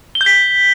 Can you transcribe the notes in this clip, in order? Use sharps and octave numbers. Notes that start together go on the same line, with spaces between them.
G7
G6
B6